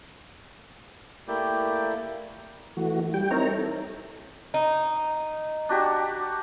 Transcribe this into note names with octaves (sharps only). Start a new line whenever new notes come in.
A3 A#3 E4 G4 D5 G5
E3 A3 F#4
G3 G5
C4 D#4 E4 A#4 C#5 A#5
A4
D#4
D4 F#4 G4